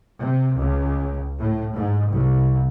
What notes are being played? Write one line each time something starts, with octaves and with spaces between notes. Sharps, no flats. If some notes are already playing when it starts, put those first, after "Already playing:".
C3
C#2
A2
G#2
C2